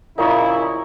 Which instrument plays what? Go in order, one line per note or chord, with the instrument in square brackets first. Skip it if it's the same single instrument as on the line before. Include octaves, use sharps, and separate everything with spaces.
[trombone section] A#1 C#3 E4 [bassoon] A#2 [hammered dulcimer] D#4 C#5 D#5